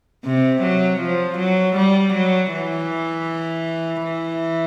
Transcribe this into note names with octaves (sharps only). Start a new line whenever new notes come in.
C3
F#3
F3
F#3
G3
F#3
E3
E3